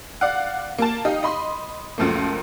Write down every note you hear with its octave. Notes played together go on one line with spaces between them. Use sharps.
D5 F5 F#5
A#3 A5
D#4 G4 D#5 F5
D#5 B5 C6
C#2 F#2 F3 A3 A#3